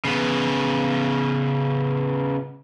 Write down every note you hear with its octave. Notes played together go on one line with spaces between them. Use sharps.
C#3 B3